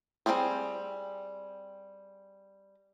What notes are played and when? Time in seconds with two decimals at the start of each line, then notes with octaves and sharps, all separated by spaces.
0.26 G3 C4 C#4 G#4 C5